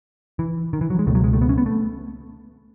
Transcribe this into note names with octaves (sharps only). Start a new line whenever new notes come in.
E3
D#3
E3
F#3
G#3
C#2 B2 A3
F#3
G#3
A3
B3
C#4
B3
A3